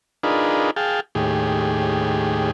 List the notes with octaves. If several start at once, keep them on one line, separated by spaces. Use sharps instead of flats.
D4 D#4 F4 G#4 A#4 B4
G#4 F5 G5 A5
D#2 A2 G4 G#4